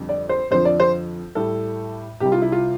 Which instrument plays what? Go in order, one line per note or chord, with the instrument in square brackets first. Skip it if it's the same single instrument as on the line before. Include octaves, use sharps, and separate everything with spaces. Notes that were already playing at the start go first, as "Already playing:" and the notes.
Already playing: [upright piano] F2 D3 G3
D5
C5
F2 D3 F3 C5
D5
C5
A2 G3 A4
C2 C3 G3 G4
F4
E4
F4